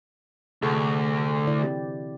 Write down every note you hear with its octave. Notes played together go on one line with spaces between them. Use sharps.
D2 C3 G#4 A4
D3 E4 D5
E3 C4 G4